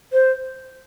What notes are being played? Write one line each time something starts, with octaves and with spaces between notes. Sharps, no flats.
C5